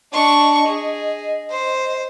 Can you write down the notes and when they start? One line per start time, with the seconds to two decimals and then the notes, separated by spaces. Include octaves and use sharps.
0.12 D4 D#5 C#6
0.67 G#4
1.50 C5